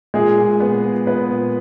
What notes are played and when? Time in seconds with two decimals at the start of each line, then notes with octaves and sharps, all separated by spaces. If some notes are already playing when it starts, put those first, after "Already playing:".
0.14 A#2 G#3 G#4
0.38 A#2
0.60 A#2 B3 B4
0.84 A#2
1.07 A#2 B3 B4
1.31 A#2